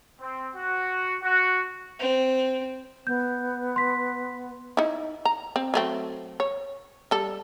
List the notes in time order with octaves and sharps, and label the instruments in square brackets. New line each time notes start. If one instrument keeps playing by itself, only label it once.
[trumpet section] C4
F#4
F#4
[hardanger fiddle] C4
[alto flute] B3 [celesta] G6
[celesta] C6 B6
[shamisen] D#4 E4
A#5
C4
F#3 A3 C4
C#5
G3 A4